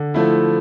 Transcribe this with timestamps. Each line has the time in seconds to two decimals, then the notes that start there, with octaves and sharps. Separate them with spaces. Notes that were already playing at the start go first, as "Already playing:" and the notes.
Already playing: D3
0.14 F3 A3 E4